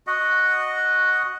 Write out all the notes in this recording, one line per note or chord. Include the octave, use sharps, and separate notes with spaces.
F#4 D#5 F#5